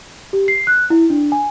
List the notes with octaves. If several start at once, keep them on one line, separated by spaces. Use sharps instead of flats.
G4
C7
F#6
E4
D4
G#5